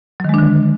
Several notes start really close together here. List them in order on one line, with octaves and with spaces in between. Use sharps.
F#3 D#3 G#3 D4 D3